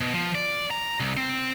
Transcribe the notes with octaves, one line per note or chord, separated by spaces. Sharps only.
B2
F3
D5
A#5
C2
C4